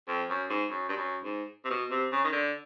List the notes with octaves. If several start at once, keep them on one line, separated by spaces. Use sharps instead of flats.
F2
F#2
G#2
F#2
G2
F#2
G#2
C3
B2
C3
C#3
D#3
D3